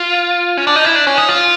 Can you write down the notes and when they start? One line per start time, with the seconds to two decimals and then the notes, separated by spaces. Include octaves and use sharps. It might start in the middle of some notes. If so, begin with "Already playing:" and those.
Already playing: F4
0.57 C#4
0.67 D4
0.76 D#4
0.85 E4
0.96 D4
1.07 C#4
1.18 D#4
1.29 F4